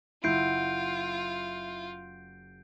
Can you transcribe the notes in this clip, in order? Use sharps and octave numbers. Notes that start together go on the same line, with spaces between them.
F#1 E4 F4 F#5 C6 G6 C7 D7